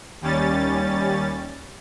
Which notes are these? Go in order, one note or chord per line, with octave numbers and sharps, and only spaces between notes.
D#2 G3 C#4 A6